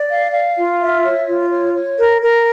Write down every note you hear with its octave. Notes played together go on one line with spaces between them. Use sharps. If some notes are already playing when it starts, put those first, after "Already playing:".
Already playing: D5
F5
F5
F4
E5
C#5
F4
C#5
C#5
A#4
A#4